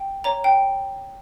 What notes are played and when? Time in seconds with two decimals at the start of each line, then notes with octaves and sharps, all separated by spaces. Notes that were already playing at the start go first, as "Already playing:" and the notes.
Already playing: G5
0.24 C#5 A#5
0.44 G5